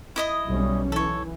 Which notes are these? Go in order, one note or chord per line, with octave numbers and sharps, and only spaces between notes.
E4 D#5 D#6
B1 G3 C#4
E3 A4 C#5